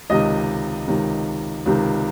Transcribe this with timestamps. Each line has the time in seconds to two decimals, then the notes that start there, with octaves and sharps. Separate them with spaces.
0.10 C#2 C3 D#3 D#5 D#6
0.88 C#2 C3 D#3
1.66 C#2 C3 D#3